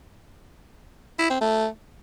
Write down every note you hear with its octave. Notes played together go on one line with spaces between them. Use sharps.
E4
C4
A3